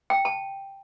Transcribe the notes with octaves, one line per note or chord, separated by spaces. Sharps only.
G5
A5